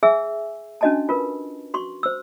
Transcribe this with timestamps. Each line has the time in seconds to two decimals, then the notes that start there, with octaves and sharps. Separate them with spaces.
0.03 G#4 E5 G#5 E6
0.81 C#4 D4 F#4 D#5 G#5 A5
1.09 F4 A#4 B4
1.74 F#4 C6 C#6
2.03 C5 E6